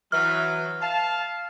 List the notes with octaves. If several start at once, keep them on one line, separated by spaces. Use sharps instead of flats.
E3 F#3 F6
F5 A5